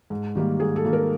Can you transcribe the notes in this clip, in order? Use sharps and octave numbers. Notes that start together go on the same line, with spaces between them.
G#2
D#3 G3 A#3
G#2 G#4
A4
D#3 G3 A#3
A#4